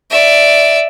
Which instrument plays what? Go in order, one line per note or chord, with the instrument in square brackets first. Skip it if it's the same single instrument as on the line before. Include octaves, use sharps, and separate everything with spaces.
[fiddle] D5 E5